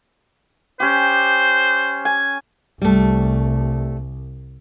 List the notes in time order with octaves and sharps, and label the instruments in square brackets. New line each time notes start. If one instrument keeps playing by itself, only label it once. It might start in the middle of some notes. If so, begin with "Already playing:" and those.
[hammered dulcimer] C#4 G4 [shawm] C5
[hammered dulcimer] G#5
[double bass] C2 [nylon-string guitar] G3 A3